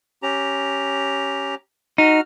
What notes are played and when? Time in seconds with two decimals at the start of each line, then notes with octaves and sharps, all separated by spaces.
0.23 C#4 G4 A#5
1.98 D#4 F#4 F6